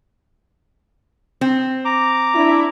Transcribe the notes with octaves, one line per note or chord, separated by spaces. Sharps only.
C4
A#5 D6
D4 E4